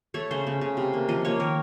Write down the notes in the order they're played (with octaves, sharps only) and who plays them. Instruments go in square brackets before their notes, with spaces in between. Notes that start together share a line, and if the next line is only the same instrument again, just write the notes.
[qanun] A3 C#5
C#3 C5
C#3
C#3
C3
A#3
F3 D#5
A#3 C#5
D#3 A#4